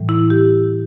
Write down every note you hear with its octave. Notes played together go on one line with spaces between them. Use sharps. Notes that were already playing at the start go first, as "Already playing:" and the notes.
Already playing: A2 E3 G3
E4
G4